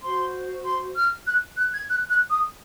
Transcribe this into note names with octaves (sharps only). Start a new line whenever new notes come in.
F#4 C5 C6
C6
F6
F#6
F#6
G#6
F#6
F#6
D#6